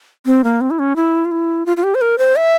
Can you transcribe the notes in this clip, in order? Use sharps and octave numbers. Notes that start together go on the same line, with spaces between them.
C4
A#3
C4
E4
C#4
E4
F4
E4
F4
F4
G4
C5
A#4
C5
E5